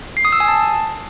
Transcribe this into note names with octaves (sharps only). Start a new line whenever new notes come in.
C7
D#6
E6
G#5
A5